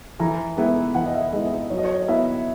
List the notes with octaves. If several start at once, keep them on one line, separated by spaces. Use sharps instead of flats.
E3 A#5
G#3 B3 E4
E3 F#5
D#5
E5
G#3 B3 E4 D#5
D#5
F#3 C#5
D#5
C#5
D#5
B3 E4 E5